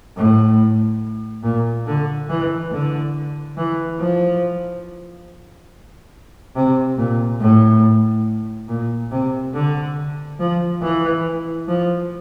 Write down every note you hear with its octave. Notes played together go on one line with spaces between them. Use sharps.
A2
A#2
D3
E3
D3
E3
F3
C3
A#2
A2
A#2
C3
D3
F3
E3
F3